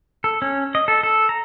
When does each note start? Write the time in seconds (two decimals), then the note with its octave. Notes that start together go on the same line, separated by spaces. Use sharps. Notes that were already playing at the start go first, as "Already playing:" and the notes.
0.24 A4
0.42 C#4
0.75 D#5
0.88 A4
1.03 A4
1.29 A#5